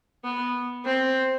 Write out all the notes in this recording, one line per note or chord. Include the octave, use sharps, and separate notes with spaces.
B3
C4